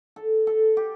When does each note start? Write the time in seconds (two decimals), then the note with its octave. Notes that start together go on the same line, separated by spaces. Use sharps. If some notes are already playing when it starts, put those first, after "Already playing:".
0.16 A4
0.47 A4
0.77 G4